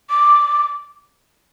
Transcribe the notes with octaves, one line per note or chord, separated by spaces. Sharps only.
D6